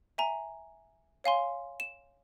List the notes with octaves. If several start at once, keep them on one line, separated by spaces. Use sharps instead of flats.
E5 G#5 A#5
C#5 F5 G#5 C6
E7